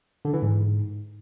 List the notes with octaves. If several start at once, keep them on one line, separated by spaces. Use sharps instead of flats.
D3
E3
G#2